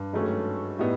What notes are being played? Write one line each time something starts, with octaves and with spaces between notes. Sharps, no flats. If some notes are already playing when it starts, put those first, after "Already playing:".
Already playing: G2
G#2 D#3 F#3 A3 C#4
A2 G3 B3 D#4